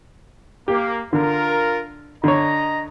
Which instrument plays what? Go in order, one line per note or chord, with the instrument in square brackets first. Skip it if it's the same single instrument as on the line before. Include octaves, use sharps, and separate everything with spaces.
[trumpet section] A#3 [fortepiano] G4
[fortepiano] D3 [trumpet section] F4 A#4
[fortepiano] D3 C#5 [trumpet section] D#5 A#5